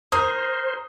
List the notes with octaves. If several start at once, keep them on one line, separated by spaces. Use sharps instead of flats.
A#4 C5 D#6